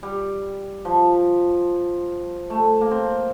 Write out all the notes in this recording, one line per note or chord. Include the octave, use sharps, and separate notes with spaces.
G3
F3
A3
A#3
C4